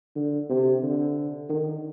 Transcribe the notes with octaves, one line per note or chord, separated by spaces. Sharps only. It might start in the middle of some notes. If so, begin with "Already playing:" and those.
D3
C3
D3
D#3